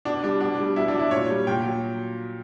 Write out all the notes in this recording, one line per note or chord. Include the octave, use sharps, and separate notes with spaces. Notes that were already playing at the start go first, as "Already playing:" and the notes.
B2 D4
G3 D4
B2 D4
G3
B2 E4
D4
F#3
E4
A#2 C#5
G3
A#2 G5
F#3